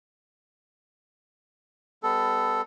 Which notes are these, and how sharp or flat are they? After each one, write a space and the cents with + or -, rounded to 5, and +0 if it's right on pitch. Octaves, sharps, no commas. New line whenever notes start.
G3 +30 B3 +25 A4 +0